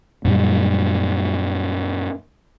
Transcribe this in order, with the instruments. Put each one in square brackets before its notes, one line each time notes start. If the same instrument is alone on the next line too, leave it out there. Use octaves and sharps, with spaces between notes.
[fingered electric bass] F#2 A#2 G3